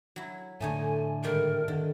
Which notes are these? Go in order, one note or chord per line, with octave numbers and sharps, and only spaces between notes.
F#3 E4
A2 D3 A3 D#4 C#5 G#5
G#2 D#3 G3 A#4
D3 D#3